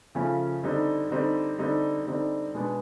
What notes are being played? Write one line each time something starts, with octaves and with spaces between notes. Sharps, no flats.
C#3 F3 A3 C#4
D3 G3 C4 D#4
D3 G3 C4 D#4
D3 G3 C4 D#4
D3 G3 C4 D#4
B2 G#3 B3 D4